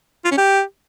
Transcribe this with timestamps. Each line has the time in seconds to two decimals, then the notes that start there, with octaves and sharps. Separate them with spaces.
0.25 F4
0.31 C#4
0.38 G4